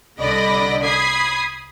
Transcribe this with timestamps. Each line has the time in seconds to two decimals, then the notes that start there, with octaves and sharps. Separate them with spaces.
0.19 C2 D3 D5 D#5 B5 A#6
0.83 B5 D#6 G#6 B6 C7